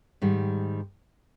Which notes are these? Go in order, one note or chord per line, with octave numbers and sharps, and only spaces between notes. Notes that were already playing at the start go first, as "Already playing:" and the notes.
G#2 D#3 G3